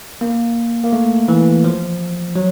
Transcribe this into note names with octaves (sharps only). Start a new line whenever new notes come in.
A#3
A#3
A3
E3
F3
F#3